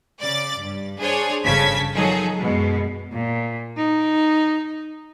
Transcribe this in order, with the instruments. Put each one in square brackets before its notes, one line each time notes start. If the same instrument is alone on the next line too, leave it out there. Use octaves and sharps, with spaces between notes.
[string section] C#3 D5 D6 A6
G2
D4 G#4 C5 C#5
G1 C#3 A5 G#6 B6
D#3 F3 F#3 D#4 G#4 A4
F#2 B2 G#3
[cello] A#2
D#4